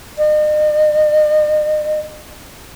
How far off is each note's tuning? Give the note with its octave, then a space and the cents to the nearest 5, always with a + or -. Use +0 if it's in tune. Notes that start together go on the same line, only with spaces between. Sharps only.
D#5 -40